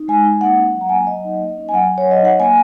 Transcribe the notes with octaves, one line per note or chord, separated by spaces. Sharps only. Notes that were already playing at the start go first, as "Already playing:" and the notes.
Already playing: D#4
G#3 G#5
D#4
A#3 F#5
C#4
F#3
A#5
A#3 G#5
F#5
F#3 D#5
D#4
A#3
C#4
G#5
F#3 F#5
C#4
C#5
F#3
D#5
D#4 F#5
A#3 G#5